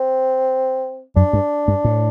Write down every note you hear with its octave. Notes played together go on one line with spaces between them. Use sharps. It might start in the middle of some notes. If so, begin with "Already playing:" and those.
Already playing: C4
F#2 D4
G2
G2
A2